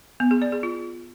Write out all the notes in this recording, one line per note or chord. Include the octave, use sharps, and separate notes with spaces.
B3
G#4
D5
G#4
F4